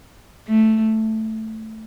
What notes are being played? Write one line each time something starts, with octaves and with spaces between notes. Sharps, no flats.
A3